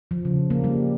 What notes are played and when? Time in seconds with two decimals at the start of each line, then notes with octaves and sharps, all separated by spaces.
0.11 F3
0.25 C#3
0.50 A#3
0.64 G3